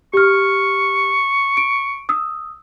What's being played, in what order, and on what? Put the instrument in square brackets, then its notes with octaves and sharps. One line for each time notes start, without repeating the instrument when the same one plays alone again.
[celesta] G4 F6 [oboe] C#6
[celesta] D7
D#6 E6